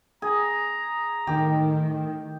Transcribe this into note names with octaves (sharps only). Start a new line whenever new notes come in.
G#4 A#5
A2 D#3 G4